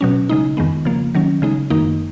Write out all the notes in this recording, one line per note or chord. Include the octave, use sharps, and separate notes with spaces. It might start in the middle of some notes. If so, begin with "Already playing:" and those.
B2 F#3 C#4
C#3 G#3 D#4
F2 D#3 G#3 B3
C#3 F3 A#3
D#3 F#3 C#4
C#3 G#3 D#4
F#2 D#3 A#3 D#4